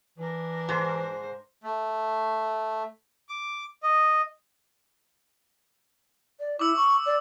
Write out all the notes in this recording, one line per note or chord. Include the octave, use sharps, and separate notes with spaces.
E3 D4 A#4
G#2 C5
A3
D6
D#5
D5
E4 D6 E6
C#6
D5